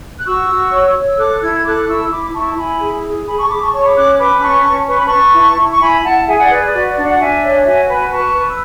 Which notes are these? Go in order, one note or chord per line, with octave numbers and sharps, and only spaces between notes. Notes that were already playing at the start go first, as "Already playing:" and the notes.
F#6
F#4 C#6 E6
F#4
C#5
C#5
E6
A4 D6 F#6
F#6
E4 E6 G#6
G#6
A4 D6 F#6
E4 C#6 E6
E4 B5 D6
E4 A5 C#6
E4 G#5 B5
G#4
G#4
G#4 G#5 B5
A5 C#6
G#4 B5 D6
A5 C#6
C#5 A5 C#6
B5 D6
C#4 D6 F#6
B4 B5 D6
C#4 A5 C#6
C#4
B4 C#6
B5
A5 C#6
B4
E4
E4
C#6
E4 G#5 B5
E4 F#5 A5
F#5
G#4 E5 G#5
D5 F#5
B4 D5
D5
F#4 D5
D5
D4
D5 F#5
D4 E5 G#5
C#5
F#4 E5 G#5
B4 G#5 B5
B4 A5 C#6
B4
E6